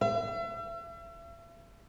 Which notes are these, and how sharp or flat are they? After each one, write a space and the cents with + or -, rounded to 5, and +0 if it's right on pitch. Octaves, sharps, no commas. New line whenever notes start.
E5 +40